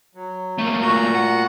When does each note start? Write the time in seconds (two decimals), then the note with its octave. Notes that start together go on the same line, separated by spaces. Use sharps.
0.15 F#3
0.59 A3 A#3
0.81 A#2 F#4 A#5
1.15 F#5